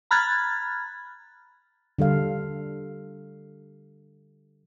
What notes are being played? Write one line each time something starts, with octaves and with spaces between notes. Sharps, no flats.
A#5 B5 F6 F#6 G#6 A6
D3 G3 A4 F5